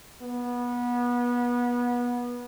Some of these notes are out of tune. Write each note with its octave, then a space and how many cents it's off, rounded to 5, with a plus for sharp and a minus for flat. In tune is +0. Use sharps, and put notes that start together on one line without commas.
B3 -25